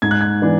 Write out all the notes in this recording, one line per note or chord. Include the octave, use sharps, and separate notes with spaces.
G#2 G#6
F#6
G#6
E3 B3 D4